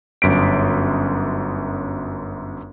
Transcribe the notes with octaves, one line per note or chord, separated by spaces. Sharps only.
G1 F#2 B6 D7